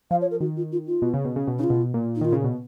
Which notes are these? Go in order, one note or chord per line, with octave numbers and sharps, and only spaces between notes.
F3 F5
C#5
A#4
D#3 F#4
F4
F4
F4
B2
C#3
B2
C#3
B2
C#3 D#4 F4
B2
A#2
D#4
D#3 F4
C#3
B2